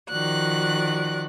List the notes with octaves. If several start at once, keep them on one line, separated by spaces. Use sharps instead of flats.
D#3 F3 F#4 D5 F#6